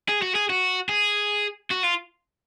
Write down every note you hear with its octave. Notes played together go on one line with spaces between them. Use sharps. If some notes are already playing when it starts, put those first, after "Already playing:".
G#4
F#4
G#4
F#4
G#4
F#4
F4